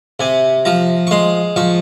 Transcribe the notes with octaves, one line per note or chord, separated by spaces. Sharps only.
C3 G#5
F3 A#5
C#6
G#3 C6
F3 C#6